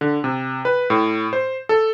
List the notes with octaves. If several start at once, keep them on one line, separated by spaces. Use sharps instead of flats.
D3
C3
B4
A2
C5
A4